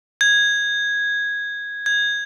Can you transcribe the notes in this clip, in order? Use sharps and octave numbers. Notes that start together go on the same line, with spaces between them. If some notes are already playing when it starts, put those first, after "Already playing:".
G#6
G#6